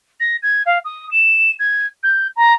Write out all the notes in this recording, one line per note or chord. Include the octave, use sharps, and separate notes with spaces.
A#6
G#6
F5
D#6
E7
G#6
G6
A#5